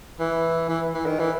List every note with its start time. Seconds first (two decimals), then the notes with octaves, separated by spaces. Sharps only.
0.20 E3
0.69 E3
0.94 E3
1.06 D#3
1.19 E3